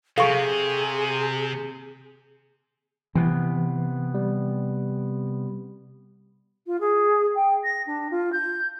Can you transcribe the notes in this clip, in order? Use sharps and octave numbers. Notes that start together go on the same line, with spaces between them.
C3 G#4 A4 F5 C#6
C3 E3 B3
G3
F4
G#4
G5
A#6
D4
F4
G6